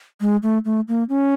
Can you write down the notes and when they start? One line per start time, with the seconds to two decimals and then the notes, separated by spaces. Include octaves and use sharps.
0.21 G#3
0.43 A3
0.65 A3
0.88 A#3
1.09 C#4